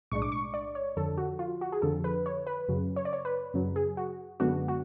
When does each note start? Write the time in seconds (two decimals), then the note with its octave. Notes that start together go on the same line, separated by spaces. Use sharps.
0.12 B1 A2 G#3 D4 C#6
0.22 D6
0.32 C#6
0.54 D5
0.75 C#5
0.97 F2 D3 F3 A4
1.18 F#4
1.39 F4
1.61 F#4
1.72 G#4
1.82 F2 D3 F3 A4
2.04 B4
2.26 C#5
2.47 B4
2.68 F#2 C#3 F#3
2.96 C#5
3.05 D5
3.13 C#5
3.25 B4
3.54 F#2 C#3 F#3
3.76 G#4
3.97 F#4
4.40 F#2 D3 G#3 B3 D4 F#4
4.68 F#4